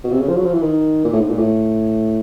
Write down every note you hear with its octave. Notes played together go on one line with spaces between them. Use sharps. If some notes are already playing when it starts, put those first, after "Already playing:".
B2
C3
C#3
F3
F#3
F3
E3
D#3
A#2
A2
G#2
A#2
A2